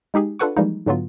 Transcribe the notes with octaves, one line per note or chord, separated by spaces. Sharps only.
G#3 D#4 G4 G#4
D4 F4 A4 B4 F#5 C#6
E3 F3 G3 G#3 A#3 D#4
G#2 D3 F#3 B3 F4